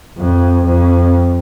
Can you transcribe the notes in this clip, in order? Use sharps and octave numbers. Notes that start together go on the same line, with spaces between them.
F2
F2